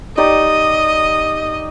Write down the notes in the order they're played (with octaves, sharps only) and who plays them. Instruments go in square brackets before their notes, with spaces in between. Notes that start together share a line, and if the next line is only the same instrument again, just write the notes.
[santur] D#4 G4 D5 [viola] D#5